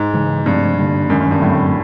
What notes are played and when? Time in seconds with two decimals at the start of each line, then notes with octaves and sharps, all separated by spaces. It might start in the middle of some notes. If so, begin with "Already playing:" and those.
Already playing: G#2
0.13 C#3 E3 G#3
0.46 G2 C3 F3 A3 C4
0.78 D3 G3 A#3 D4
1.09 F#2 D#3 G#3 C#4
1.20 F#2
1.31 G2
1.42 A2 D3 F#3 A3 C4
1.52 A2